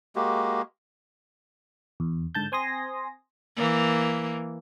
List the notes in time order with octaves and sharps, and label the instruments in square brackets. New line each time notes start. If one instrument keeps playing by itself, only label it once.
[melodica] G#3 A#3 F#4 G4
[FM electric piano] E2
G#2 D3 A5 G6
C4 G#5 C6 D#6 A#6
[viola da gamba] E3 A#3